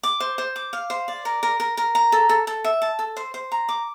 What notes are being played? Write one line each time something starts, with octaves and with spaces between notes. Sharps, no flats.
D6
C5
C5
D6
F5
C5
D5
A#4
A#4
A#4
A#4
A#5
A4
A4
A4
E5
A5
A4
C5
C5
A#5
D6